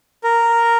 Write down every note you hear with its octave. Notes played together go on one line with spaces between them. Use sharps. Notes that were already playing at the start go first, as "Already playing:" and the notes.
A#4